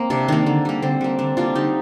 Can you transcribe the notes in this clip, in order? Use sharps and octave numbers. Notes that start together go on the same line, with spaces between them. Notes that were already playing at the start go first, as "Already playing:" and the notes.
Already playing: A#3 C4
C3 D4
D#3 A#3 D4
D3
G3 A#3
D3 C4
G3 A#3 D4
D3 D4
G3 A#3 D4 F4
D3 D#4 G4